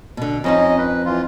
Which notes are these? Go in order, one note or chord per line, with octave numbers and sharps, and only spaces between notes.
B2 D3
F2 C4 C#4 D#4 D#5
B4
E3 F4